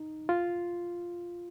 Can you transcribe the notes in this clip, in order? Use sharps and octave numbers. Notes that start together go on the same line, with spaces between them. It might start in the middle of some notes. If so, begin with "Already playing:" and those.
Already playing: D#4
F4